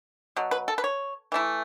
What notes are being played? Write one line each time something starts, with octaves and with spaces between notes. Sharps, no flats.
B2 F#3
B4
A4
B4
C#5
E3 A3 E4